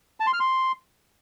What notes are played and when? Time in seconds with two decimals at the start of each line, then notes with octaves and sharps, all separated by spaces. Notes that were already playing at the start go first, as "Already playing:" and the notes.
0.20 A5
0.27 C6
0.33 F6
0.40 C6